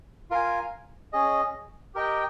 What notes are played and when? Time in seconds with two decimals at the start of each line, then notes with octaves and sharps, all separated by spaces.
0.30 F4 A#4 F5 G#5
1.13 C#4 G#4 D#5
1.95 G4 A#4 D#5 G5